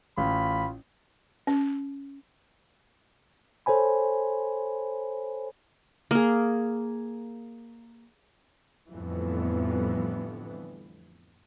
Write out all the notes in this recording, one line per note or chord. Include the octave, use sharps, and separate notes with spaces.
A1 F4 B5
C#4
A4 C5 C#5 G#5 B5
A#3 G#4
F2 A2 D3 E3 G3 B3